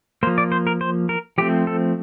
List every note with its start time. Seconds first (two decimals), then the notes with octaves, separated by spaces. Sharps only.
0.23 A#3 C5
0.27 F3
0.38 D5
0.52 C5
0.67 A#4
0.81 C5
1.09 A#4
1.38 F3 A3 C4 G4
1.67 A4